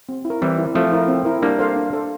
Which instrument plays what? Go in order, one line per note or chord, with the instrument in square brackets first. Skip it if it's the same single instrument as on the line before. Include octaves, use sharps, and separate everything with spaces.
[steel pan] C4
E4
A#4
[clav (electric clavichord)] E3 G3 [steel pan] C4
[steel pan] E4 A#4
[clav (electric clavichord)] F3 A3 [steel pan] C4
[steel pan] E4 A#4
C4
E4 A#4
[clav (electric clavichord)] G3 A#3 [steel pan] D4
[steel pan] A4 C5 F5
D4
A4 C5 F5